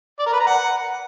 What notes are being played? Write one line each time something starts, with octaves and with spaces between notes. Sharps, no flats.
D5
A#4
B4
A#5
F#5